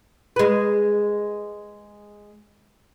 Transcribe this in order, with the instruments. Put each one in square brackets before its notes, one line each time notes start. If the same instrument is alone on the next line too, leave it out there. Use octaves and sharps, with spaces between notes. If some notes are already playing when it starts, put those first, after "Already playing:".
[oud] G#3 B4